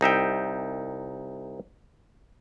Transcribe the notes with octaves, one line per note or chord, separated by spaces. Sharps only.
C2 D#4 E5 G5